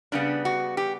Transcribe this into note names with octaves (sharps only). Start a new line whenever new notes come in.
C#3 G3 B3 D4
F#4
G4